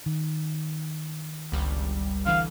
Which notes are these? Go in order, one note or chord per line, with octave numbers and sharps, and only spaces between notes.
D#3
G1 C#2 G3
D3 E3 F5